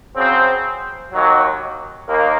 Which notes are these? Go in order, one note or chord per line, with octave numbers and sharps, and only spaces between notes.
C#3 F#3 C4
D#2 D#3 F#3
D#2 D#3 A#3